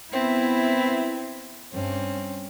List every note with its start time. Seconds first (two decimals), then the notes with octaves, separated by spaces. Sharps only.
0.13 B3 C4 E4
1.73 G2 C4 C#4